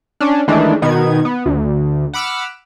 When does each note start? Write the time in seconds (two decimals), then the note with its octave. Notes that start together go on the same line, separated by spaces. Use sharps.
0.20 C#4 D4
0.48 D#3 E3 G#3 A3 D4
0.82 B2 D#3 B3 G#6
1.25 B3
1.46 D2
2.14 F#5 B5 D6 E6 F6